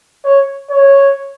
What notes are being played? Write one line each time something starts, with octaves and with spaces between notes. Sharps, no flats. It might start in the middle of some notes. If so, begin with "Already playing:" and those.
C#5
C#5